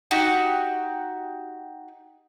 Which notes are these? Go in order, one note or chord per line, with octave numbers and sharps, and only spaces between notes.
D#4 F#4 G4